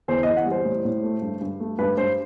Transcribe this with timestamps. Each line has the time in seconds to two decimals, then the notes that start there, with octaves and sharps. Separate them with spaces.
0.08 E2 C5
0.23 E2 D#5
0.37 F#5
0.46 G3
0.51 C5
0.65 A2
0.85 A2
1.03 A3
1.22 G2
1.41 G2
1.60 A3
1.79 G2 B4
1.97 G2 C5